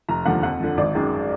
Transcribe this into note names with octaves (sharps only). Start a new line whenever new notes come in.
F1 A#5
D#2 D3 F3 A#3 F#5
F2 F#5
D3 F3
G#1 D5
F#2 D#3 G#3